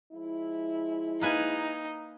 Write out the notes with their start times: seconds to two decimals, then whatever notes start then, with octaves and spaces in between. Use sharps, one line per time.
0.12 F3 G#3 E4
1.22 A#3 D#4 B4 G#5